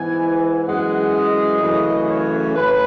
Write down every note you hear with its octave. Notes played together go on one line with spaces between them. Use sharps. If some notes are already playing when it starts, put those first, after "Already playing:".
Already playing: G#2 E3 B3 G#5
F#2 E3 G#3 F#5
D#5
F#2 C#3 E3 A3 C#4
C#5
A2 B4